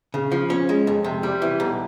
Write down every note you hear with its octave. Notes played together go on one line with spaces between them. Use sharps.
C#3
F3
C#4
G#3
F2
C3
G3
E3
B1